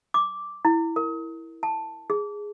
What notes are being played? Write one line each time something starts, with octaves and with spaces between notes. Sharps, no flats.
D6
E4
A#4
A5
G#4